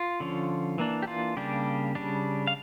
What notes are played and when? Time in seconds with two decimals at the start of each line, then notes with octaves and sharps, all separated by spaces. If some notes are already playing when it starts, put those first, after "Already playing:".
Already playing: F4
0.20 D3 F3 C#4
0.78 E3 A#3 D4
1.02 G4
1.08 F4
1.37 C#3 G3 A#3 D4 G4
1.95 C#3 G3 D4
2.47 F5